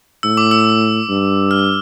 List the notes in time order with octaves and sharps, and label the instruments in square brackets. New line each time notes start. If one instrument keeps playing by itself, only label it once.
[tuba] A2 [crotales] E6
[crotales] D6
E6
[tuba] G2
[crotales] F6